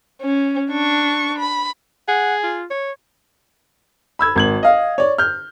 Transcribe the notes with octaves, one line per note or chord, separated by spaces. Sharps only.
C#4
D4 C#6
B5
G#4 F#5
F4
C#5
B5 E6 G#6
G#1 G#6 F#7
D#5 F5
C#5 D5
F6 G6